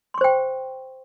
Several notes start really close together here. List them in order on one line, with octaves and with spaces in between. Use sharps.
C6 C#6 C5 G5